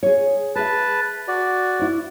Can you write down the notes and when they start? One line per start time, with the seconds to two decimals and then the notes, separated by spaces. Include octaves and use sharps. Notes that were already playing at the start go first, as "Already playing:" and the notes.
0.03 G#4 C#5
0.55 G#4 B4 E5 A5
1.28 F#4 D5
1.79 E4 C5